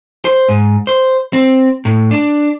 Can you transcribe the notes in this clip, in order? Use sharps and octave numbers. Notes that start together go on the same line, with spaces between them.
C5
G#2
C5
C4
A2
D4